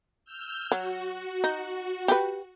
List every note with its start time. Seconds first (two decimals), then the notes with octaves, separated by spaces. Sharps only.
0.25 E6 F6 G6
0.72 F#3 F#4
1.44 D#4
2.08 G4 G#4 B4